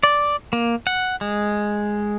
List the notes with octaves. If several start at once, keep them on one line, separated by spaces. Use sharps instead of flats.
D5
A#3
F#5
G#3